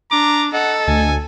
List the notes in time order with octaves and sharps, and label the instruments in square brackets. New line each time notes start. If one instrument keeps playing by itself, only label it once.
[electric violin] D4 [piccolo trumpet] A#5 [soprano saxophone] D6
[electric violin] A4 [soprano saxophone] D#5 [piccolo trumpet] F#5
[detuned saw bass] D2 [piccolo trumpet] G#5